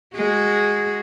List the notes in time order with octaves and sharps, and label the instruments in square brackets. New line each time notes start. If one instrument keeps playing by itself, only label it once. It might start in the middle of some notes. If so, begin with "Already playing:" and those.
[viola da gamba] G#3 F#4 G#4